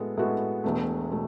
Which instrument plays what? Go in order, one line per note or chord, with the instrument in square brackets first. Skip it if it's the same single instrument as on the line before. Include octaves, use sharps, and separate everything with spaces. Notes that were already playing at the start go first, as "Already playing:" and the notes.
Already playing: [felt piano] A2 G#3 B3 F#4 A4
A2 G#3 B3 F#4 A4
E1 E2 B2 A3
B2 A3